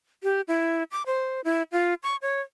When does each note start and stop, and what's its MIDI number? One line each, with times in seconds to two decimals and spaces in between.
0.24 0.41 67
0.48 0.83 64
0.91 1.03 86
1.06 1.41 72
1.44 1.63 64
1.72 1.94 65
2.03 2.16 85
2.22 2.40 73